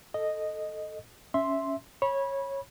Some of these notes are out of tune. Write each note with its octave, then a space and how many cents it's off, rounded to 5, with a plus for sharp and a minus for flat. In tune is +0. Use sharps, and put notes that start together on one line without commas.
A4 +0 D#5 -5
C#4 +5 E5 +0 C6 +0
C#5 -15 B5 -20